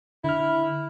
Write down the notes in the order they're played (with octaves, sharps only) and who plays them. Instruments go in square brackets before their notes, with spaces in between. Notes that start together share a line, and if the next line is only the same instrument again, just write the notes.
[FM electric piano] D3 F6 [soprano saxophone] E4